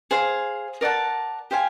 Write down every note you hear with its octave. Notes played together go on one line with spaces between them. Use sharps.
G#4 C5 F5
A#4 D5 F#5 A5
G4 C5 F5 G#5